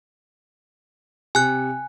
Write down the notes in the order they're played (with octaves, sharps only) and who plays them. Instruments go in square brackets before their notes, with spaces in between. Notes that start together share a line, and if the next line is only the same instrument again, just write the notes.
[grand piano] C3 [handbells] G#5 F#6